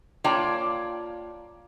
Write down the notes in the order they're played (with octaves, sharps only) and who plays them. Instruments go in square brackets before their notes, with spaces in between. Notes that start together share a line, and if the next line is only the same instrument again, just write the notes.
[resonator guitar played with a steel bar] A#3 F4 C#5 D5 G5 A5